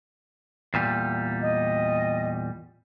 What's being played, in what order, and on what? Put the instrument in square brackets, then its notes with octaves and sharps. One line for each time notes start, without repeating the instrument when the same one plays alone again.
[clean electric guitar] E2 A#2 G3
[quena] D#5